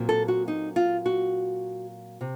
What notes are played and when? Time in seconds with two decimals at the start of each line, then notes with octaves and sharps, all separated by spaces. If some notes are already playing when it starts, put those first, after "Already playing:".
Already playing: A#2 F#3 C4
0.09 A4
0.28 F#4
0.48 D#4
0.76 F4
1.06 F#4
2.21 C3